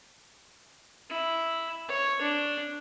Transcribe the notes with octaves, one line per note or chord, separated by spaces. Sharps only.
E4
C#5
D4